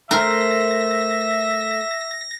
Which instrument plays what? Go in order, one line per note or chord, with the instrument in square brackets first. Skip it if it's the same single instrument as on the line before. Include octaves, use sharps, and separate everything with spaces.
[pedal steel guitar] A3 C5 [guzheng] A#4 [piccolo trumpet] E5 [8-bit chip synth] A#6